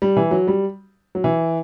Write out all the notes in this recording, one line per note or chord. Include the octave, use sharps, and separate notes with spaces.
G3
E3
F#3
G3
F#3
E3